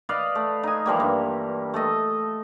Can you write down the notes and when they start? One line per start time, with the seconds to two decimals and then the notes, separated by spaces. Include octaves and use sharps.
0.09 B4 D5 D#5 F5
0.35 A3
0.63 D#4 G#5
0.86 E3 F3 G3 A#3
1.00 G2
1.74 A3 A4 D#5